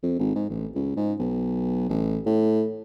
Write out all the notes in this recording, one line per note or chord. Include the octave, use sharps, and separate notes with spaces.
F2
G#1
G#2
A1
C#2
G#2
B1
A1
A2